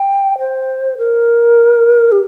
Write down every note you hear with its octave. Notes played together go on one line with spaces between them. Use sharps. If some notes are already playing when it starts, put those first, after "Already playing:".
Already playing: G5
C5
A#4
G4